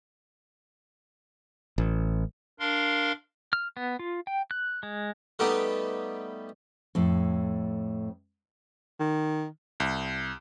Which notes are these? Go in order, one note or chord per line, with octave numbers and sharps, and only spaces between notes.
A1
D4 A#4 F5 C6
F6
B3
F4
G5
F#6
G#3
G3 A3 B3 D#4 G4
F2 A2
D#3
C2